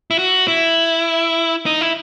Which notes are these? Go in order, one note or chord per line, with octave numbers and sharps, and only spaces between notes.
E4
F#4
E4
D#4
E4